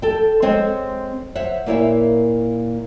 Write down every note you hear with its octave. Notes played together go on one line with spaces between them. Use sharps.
A4 G5
G#3 C4 C5 C#5
C5 C#5 E5 F#5
A#2 A#3 E4 A4 C#5 E5